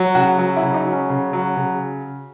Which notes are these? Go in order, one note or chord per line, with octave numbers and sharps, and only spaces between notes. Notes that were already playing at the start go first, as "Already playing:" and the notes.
Already playing: F#3
C#3 F#4
F#3
E4
C#3
D#4
F#3
C#4
C#3
F#3
C#3